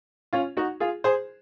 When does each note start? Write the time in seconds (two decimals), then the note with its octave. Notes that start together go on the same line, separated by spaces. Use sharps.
0.33 C#4 F4
0.57 D#4 F#4
0.80 F4 G#4
1.04 G#4 C5